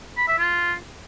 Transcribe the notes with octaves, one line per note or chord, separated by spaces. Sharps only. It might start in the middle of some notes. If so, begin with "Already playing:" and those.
B5
E5
F4